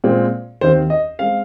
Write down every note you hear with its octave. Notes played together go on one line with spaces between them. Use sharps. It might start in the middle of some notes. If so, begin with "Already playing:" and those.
A#2 G#3 C4
D#2 D#3 C4 C5
D#5
G#3 C4 F5